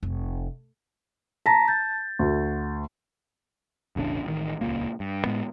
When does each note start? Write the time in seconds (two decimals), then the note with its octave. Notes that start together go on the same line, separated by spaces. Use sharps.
0.03 F1
1.46 A5 A#5 A#6 B6
1.68 G6 A6
2.19 D2
3.96 E1 A1 C#3 D4
4.25 A1 D#3
4.61 D#1 C#2 A#2 A#3
5.00 G2
5.25 A2 G#3 B3